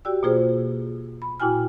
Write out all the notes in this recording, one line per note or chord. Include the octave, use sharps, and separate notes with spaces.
F#4 G4 D5 G5 E6
B2 A#3 F4 G#4 C5
B5
A#2 E4 F#4 G5 G#5 F6